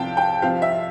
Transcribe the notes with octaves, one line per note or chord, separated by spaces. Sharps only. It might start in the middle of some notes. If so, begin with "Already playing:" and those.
Already playing: C2 C3 F3 F5 G5 A5
G5
C2 C3 F3 F5
E5